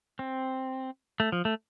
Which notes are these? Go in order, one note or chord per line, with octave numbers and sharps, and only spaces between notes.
C4
A3
F3
A3